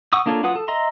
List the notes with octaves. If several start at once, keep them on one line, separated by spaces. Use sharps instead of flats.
F#5 C#6 D#6 E6
A#3 D4 F4 A4 C#5
F#3 F4 B4 F#5 D#6
A4
D#5 E5 A#5 C6